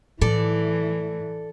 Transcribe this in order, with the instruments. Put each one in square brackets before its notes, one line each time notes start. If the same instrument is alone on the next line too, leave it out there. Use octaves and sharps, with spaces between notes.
[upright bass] A2 [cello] E3 [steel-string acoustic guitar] A4 D5